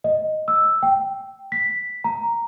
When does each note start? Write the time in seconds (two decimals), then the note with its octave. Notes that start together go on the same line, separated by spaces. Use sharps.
0.04 D#5
0.48 E6
0.83 G5
1.52 B6
2.04 A#5